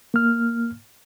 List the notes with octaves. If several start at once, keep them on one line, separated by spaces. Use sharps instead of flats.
A#3 F6